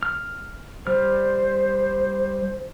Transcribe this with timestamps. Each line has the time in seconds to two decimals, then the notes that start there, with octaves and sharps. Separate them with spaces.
0.03 F6
0.87 G3 C5 F6